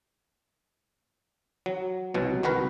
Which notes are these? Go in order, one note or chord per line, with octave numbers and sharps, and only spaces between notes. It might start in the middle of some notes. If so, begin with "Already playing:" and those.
F#3
C2 B2 F#3
C2 D#3 F#4 A#4 B4